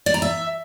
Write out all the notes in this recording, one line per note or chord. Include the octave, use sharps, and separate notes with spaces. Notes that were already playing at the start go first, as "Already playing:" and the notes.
D5
A#5
E5